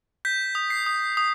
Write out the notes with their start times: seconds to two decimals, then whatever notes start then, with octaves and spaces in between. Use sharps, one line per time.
0.25 G6 B6
0.55 D#6
0.70 C7
0.86 D#6
1.17 D#6